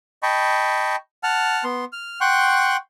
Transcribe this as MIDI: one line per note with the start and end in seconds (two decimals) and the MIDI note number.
0.23 0.96 75
0.23 0.96 79
0.23 0.96 81
0.23 0.96 83
0.23 0.96 85
1.23 1.64 78
1.23 1.64 81
1.23 1.64 89
1.64 1.85 59
1.64 1.85 84
1.92 2.20 89
2.21 2.77 78
2.21 2.77 79
2.21 2.77 84
2.21 2.77 85
2.21 2.77 90